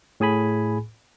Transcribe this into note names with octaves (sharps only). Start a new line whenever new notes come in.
A2 G#4 G#5 B5